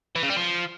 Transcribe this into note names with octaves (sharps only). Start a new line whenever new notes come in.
E3
C#3
G3
F3